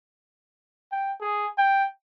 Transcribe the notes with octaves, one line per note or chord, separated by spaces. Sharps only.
G5
G#4
G5